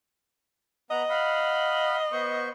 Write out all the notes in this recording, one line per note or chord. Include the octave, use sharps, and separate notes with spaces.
B3 D#5 F#5 A#5
F5 F#5 B5
B3 C5 C#6